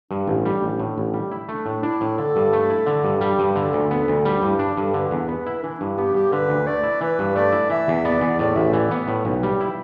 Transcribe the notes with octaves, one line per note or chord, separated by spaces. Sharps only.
G2 D4
A1
G3
A1
A2
A1
G3
E4
A3 D4
A2
D4 E4
A2
D3 A4
G2
A3
E4
D3
G2
G3
G2
D3 A4
D2
B3 A4
D2
G3 G4
G2 E4
D4
G2 A4
D3 B4
E2
B3 B4
E4
E3 D4
G2 E4
B3 G4
G2 G4
D3 B4
D2
A3 D5
E4
E3 B4
G2
A3 D5
E4
E3 E5
E2
B3 D5
E2
A2 D5
A1 E5
E3 D5
B3 B4
A2
B1
G3
E4